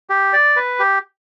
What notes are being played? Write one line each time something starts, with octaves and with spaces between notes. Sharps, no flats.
G4
D5
B4
G4